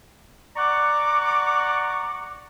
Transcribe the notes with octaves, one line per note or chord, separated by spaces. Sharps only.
D5 F#5 A#5 C#6 D6